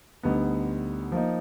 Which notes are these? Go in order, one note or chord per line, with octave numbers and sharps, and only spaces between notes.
D2 D3 G3 B3 D#4
F3 A#3 D#4